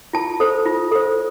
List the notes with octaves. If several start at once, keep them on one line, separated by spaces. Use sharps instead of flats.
F4 A5
A4 C5
F4
A4 C5